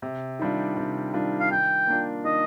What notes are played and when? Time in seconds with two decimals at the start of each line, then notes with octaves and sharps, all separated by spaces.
0.02 C3
0.39 D#3 G3 D4 F4
0.77 C3
1.14 D#3 G3 D4 F4
1.40 F5
1.51 D#3 G5
1.87 A#3 D4 F4
2.25 D#3 D#5